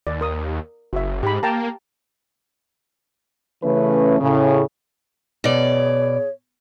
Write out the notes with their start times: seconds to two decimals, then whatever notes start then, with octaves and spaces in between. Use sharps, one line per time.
0.07 D#2 D5
0.21 A#4 D#6
0.93 F#1 F#4 E5
1.23 G#2 G4 B5
1.43 A#3 G5 A5 A#5
3.63 C#3 E3 A3 C#4 B4
4.20 A2 C#3
5.44 B2 G#4 C#5 D5